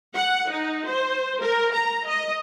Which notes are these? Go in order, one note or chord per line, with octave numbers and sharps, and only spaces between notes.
F#5
D#4
C5
A#4
A#5
D#5